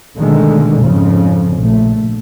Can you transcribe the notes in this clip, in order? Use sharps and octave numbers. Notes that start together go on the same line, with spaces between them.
B2 D3 D#3 G#3 A3
F2 G#2 C#3 F3
A#1 A3